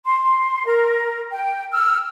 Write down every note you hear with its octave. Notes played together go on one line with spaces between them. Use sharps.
C6
A#4
G5
E6 F6